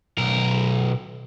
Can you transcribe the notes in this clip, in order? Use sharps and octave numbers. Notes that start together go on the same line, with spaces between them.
B1 A#4